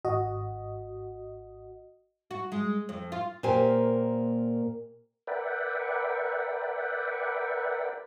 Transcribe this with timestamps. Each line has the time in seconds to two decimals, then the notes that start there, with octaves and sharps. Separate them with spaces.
0.05 G#1 F#4 D#5
2.31 F#4
2.52 G#3
2.89 F2
3.12 F4
3.43 A#2 A#3 G4 C5 G#5
5.27 A#4 B4 D5 E5 F#5 G5